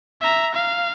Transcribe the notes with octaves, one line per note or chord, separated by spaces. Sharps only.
E5 A#5
F5